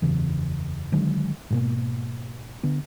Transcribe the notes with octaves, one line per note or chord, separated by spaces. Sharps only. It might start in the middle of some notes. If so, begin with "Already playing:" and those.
F#1 E2 C#3 E3
D3 D#3 F#3 G#3
G#2 B2 A#3
D3 B3